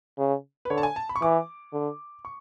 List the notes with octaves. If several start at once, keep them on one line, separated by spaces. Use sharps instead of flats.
C#3
B4
D3 C#5
A5
G#5
A5
B5
C#6
E3 D6
D3
C#6